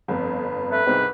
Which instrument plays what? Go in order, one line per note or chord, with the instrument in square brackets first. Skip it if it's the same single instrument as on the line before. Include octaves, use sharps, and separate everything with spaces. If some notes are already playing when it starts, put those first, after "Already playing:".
[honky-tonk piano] G1 F2 [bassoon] B4
[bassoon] A3 [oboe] B4
[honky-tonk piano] C2 C4 [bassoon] G#2